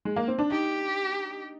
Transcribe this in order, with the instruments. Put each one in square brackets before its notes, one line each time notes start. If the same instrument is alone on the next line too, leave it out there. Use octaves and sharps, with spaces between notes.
[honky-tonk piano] G#3
A#3
C4
D4
[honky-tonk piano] D#4 [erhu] G4